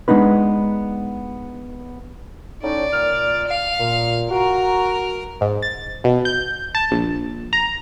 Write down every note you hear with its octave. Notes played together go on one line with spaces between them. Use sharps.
G#3 B3 D4 D#4 B4
A2 C#4 D#4 D5
A#2 F6
F5
A#2
F#4 A#4 A#5
G#2
A6
B2
G6
A5
A#1
A#5